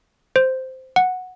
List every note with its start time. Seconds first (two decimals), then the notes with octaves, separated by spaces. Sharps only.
0.36 C5
0.96 F#5